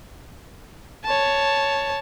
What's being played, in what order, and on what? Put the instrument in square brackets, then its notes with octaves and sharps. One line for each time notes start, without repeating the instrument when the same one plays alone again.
[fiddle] C#5 A5